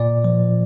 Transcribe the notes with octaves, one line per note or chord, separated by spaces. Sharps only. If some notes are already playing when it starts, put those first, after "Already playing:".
Already playing: A#2 D5
F3